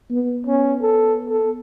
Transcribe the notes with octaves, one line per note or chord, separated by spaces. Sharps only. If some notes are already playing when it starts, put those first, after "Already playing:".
B3
B3 C#4
A4
A4